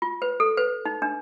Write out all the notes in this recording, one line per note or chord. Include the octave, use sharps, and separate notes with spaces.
F4
B4
A4
B4
D#4
D4